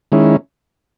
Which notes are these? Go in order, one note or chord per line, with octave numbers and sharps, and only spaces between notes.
D#3 G#3 C#4 E4